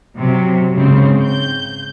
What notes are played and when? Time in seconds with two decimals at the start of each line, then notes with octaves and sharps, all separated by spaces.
0.16 C3 F#3
0.73 G#2 C#3 C4
1.25 G6